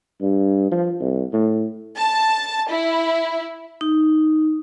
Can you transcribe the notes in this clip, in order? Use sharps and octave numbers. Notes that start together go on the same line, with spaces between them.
G2
F3
C2
A2
A5
E4
D#4